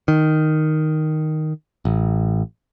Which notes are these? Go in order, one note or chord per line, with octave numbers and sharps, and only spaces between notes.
D#3
A1